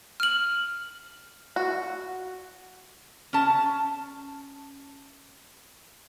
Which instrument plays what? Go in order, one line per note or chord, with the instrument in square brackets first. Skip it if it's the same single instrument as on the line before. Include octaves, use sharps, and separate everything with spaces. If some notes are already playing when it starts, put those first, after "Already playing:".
[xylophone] F6 F#7
[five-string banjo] F#4
[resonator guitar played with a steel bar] C#4 A5